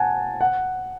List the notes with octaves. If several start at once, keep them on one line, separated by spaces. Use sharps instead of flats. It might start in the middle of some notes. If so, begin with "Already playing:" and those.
Already playing: F#5 G#5 A5
F#5